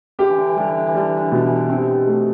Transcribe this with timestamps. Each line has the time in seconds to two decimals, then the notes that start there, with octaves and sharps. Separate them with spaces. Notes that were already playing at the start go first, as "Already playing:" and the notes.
0.19 D3 G4
0.28 E3
0.38 D3
0.48 E3
0.56 D3 G3
0.68 E3
0.78 D3
0.87 E3
0.94 D3 G3
1.07 E3
1.17 D3
1.26 E3
1.32 B2 D3
1.46 E3
1.56 D3
1.69 C3 C4
2.07 A3